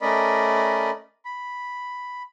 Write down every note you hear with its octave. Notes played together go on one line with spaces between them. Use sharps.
A3 C#4 A#4 D5 D#5 B5
B5